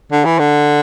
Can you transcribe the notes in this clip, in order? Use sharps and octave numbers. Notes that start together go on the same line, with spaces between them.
D3
E3
D3